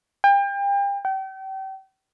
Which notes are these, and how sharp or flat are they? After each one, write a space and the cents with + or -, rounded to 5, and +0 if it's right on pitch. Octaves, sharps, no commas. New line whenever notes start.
G5 +35
G5 -35